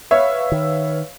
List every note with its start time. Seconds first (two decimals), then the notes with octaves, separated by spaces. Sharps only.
0.11 B4 C#5 E5 F5
0.52 D#3